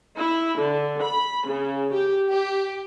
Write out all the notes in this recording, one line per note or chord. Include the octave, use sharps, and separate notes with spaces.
E4
D3
B5
C#3
G4
G4